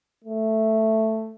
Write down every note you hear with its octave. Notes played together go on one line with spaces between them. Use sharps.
A3